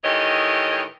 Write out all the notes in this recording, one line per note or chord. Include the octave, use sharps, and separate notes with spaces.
A2 D#3 E3 G4 C#5 D#5